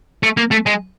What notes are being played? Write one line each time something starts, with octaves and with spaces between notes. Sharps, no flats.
A3
A#3
A3
G#3